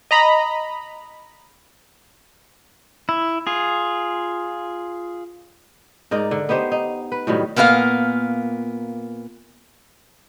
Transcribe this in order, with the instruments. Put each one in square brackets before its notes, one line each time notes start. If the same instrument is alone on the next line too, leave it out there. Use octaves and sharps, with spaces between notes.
[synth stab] D#5 A#5 B5
[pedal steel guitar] E4
F4 G#4
[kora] G#2 D#4 A#4 D5
D3
B3 D#4 G4 C5
D#4
B4
A2 D#3 F#3 G3
[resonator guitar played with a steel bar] A#2 A#3 B3 F#4 F5